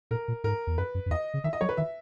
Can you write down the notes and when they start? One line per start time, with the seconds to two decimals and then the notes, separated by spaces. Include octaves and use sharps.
0.11 A#2 A#4
0.28 A#2
0.44 G#2 A#4
0.67 E2
0.78 F#2 B4
0.95 F#2
1.06 F#2
1.11 E2 D#5
1.34 C#3
1.44 D#3 E5
1.53 D#5
1.61 F#3 C#5
1.69 B4
1.77 D#3 E5